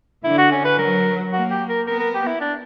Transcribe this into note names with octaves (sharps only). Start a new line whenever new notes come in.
D3 E4
F#4
C#4
B4
F#3 A#4
A#3 F#4
G4
A#4
B3 A#4
A#4
G4
E4
D4